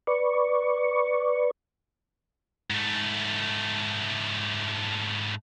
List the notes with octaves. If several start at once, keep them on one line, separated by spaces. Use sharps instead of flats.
B4 D5 C#6
G#2 A3